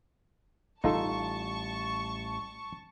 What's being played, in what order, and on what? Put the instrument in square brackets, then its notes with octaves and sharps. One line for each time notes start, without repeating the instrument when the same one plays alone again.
[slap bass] A1 G3 [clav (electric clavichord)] D#4 F4 A4 [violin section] A5 C#6